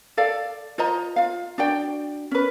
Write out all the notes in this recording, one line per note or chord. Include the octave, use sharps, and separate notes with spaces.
A4 D5 F5
F4 C5 D#5 A#5
F4 F5
D4 F#4 D5 G5
C#4 B4